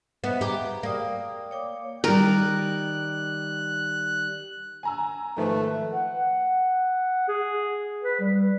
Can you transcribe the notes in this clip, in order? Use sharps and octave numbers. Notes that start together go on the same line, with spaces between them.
B3 B4 D#5 E5
G4 G#4 A#5
A#3 D5 G5 D#6
C#5 G5 D6
D#3 G3 A#4 F#6
G#5 A#5 E6
G#2 D#3 F3 A3 B4
F#5
G#4
B4
G3